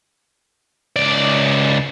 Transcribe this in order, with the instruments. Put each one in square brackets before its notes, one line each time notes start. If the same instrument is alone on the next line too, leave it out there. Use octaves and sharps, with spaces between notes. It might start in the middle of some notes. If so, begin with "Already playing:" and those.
[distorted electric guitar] C#2 D5